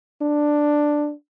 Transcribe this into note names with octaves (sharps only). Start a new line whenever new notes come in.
D4